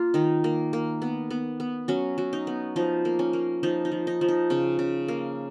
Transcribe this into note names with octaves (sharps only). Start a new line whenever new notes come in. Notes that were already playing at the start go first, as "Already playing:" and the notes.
Already playing: A#3 F4
D#3 D#4
A#3
A#3
B3
B3
B3
F#3 C#4
F#3
D#4
B3
F3 D#4
A#3
C#4
A#3
F3 D#4
D#4
F3
D#4
F3
D#4
C#3 C#4
C#3
A#3